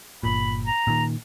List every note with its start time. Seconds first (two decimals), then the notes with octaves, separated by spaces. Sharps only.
0.23 G1 A#2 B5
0.66 A#5
0.87 A#2 D#3